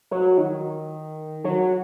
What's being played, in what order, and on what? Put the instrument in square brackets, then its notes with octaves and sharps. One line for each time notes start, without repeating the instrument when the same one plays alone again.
[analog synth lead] F#3
D#3
F#3